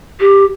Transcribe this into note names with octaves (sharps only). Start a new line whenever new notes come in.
G4